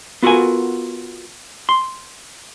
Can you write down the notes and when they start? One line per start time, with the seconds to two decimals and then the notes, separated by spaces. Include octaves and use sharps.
0.22 B3 F4 F#4 A4 A#4 G#5
1.69 C6